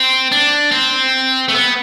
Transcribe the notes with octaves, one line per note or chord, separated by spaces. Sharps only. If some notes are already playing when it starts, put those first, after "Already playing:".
Already playing: C4
D4
C4
A3
B3